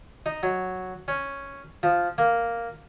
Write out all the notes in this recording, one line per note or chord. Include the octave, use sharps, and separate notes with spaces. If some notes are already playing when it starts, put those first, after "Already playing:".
D#4
F#3
C#4
F3
A#3